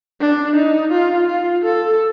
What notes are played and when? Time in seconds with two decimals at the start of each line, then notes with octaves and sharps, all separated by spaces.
0.21 D4
0.55 D#4
0.92 F4
1.28 F4
1.65 A4